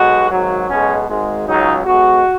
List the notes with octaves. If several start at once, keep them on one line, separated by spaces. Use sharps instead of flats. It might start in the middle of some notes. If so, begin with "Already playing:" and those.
Already playing: B1 B2 G#3 F#4
G#1 G#2 F#3
B1 B2 G#3 C#4
G#1 G#2 G#3
C#2 C#3 F#3 D#4
B1 B2 G#3 F#4